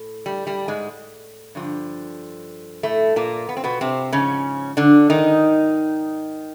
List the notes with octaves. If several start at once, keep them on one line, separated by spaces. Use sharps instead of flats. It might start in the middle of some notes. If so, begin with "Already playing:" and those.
Already playing: A2
G3
G3
G#2 G#3
G2 D3 F3
A2 A3
A#2 A#3
B3
C4
B2 B3
C3 C4
G#2 C#3 F3 C#4
D3 D4
D#3 D#4